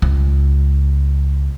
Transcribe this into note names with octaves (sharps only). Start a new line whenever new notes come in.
C#2